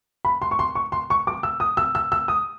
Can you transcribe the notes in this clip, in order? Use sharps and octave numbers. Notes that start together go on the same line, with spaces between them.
B5
C6
C#6
C6
C#6
C6
C#6
D6
E6
D#6
E6
E6
E6
D#6